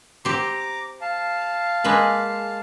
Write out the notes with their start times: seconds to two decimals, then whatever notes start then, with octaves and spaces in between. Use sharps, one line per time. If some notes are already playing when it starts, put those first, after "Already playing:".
0.25 C4 G4 A#5 D6
1.01 F5 A5
1.84 G#3 A#3 B4